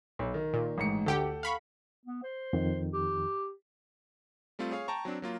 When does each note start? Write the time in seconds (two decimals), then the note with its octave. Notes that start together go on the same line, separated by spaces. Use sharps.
0.19 B1
0.34 D#3
0.54 A#2
0.78 A1 G#2 C#7
1.06 D2 G4 A4 F#5 G5
1.43 F5 B5 C#6
2.05 B3
2.23 C5
2.53 F2 D#3
2.93 G4
4.59 G3 A3 C4 F4
4.71 G#4 C#5 F5
4.88 G5 A5 A#5 C#6
5.05 F#3 C4 D4
5.22 F#3 A#3 F4